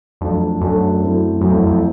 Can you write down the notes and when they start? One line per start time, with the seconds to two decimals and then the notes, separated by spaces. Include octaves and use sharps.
0.21 F2 F#3 A3 D4
0.61 F#2 F#3 A3 D4
1.01 F#3 A3 C4 E4
1.41 F#2 F#3 A3 C4 E4
1.50 F2
1.66 F2